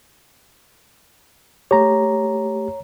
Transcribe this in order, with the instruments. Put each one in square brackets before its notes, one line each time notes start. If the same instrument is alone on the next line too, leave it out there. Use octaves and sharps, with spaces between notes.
[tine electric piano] A3 G4 [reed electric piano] C#5 A#5